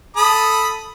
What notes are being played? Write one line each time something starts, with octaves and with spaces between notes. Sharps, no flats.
A4 B5 D#6